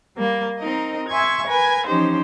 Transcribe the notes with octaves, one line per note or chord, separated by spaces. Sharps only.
G3 A#3
C4 D#4 A#4 D#5
E5 G#5 C6 C#6 G#6
A#4 B4 G#5
E3 F3 C#4 D#4 G4 C5